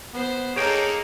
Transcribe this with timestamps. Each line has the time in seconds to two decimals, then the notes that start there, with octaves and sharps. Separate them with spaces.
0.14 B3 C5
0.56 A#3 D#4 G#4 A4 C#5 G5